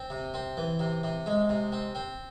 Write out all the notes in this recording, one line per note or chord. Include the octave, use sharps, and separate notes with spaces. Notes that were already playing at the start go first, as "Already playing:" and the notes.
Already playing: C4
C3
C4
E3
C3
C3
G#3
C3
C4
C4